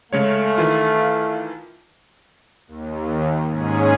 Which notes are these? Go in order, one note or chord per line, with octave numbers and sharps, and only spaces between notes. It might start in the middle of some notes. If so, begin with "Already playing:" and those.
C#3 G#3 A3 C#5 F5
D#3 E3 F4
D#2
G#2 C#4 G#4